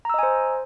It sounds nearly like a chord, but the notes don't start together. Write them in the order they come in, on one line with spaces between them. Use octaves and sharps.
A#5 E6 D#5 G#5 C5